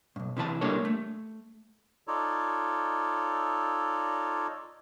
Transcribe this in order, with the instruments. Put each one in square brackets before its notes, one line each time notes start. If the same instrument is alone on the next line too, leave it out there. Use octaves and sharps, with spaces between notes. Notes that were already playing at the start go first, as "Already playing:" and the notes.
[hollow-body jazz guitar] B1 G2
C3 E3 A4 A5
G3 A#3 D4 A4 A#4 C#5
A3
[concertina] D#4 F4 A4 C#5 D5